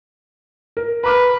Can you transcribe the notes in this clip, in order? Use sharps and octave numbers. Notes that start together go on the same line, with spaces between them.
A#4
B4 A#5 D6 F6